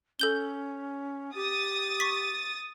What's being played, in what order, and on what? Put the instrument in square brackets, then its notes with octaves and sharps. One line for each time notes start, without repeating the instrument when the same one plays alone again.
[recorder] C#4 [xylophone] A4 G6 G7
[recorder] G4 [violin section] D#6 A6
[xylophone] C#6 B6